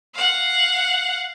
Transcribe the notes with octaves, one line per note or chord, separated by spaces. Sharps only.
F5 F#5